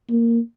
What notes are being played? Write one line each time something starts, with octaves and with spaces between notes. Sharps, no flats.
A#3